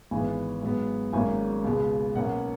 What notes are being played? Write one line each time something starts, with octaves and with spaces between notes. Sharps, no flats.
G#1 G#2 E3 B3 G#5
G#2 F#3 B3
G#1 G#2 F#3 A#3 C#4 G#5
C#2 B2 G#3
B1 B2 A#3 C#4 F#5